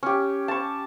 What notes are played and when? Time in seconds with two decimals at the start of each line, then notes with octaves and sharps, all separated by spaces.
0.03 C#4 G4
0.48 A5 C#6